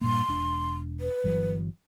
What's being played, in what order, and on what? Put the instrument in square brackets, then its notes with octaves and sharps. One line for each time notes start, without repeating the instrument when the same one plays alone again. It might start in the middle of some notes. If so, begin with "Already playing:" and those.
[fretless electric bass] G2 A#2 A#3 [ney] C6
[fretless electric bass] E1 D4
[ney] B4
[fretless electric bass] G1 E3 F#3